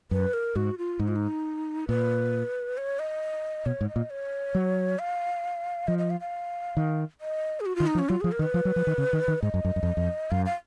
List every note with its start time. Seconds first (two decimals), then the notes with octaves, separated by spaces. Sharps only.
0.11 F#2 B4
0.33 A#4
0.56 G#2 F#4
0.78 F4
0.99 G#2 D#4
1.08 F4
1.16 D#4
1.88 A#2 B4
2.77 C#5
2.99 D#5
3.66 B2 C#5
3.81 G#2
3.89 D#5
3.96 A#2
4.10 C#5
4.55 F#3
4.99 F5
5.87 F3 D#5
5.98 D#5
6.10 F5
6.21 F5
6.77 D#3
7.21 D#5
7.60 G#4
7.66 F#4
7.76 D#3 F4
7.87 D#4
7.95 F3
7.99 C#4
8.09 F#3 F4
8.21 F3 G#4
8.32 A#4
8.39 D#3
8.42 B4
8.54 F3
8.65 F#3
8.76 F3
8.87 D#3
8.98 C#3
9.13 D#3
9.28 D#3
9.42 G#2 D#5
9.54 F#2
9.65 F#2
9.76 F#2
9.83 F2
9.97 F2
10.31 F#2 F5
10.46 F5